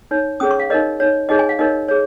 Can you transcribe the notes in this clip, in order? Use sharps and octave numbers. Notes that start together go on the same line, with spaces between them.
D#4 C#5
C#4 G#4 C#5 D#6
C#6
F5
D#4 A#4 C#5 D#5
D#4 C#5
D#4 G#4 C#5 D#5
G#5
F5
D#4 A#4 C#5 D#5
G#4 C#5